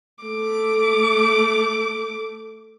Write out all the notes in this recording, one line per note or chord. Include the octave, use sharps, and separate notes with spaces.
A3 D6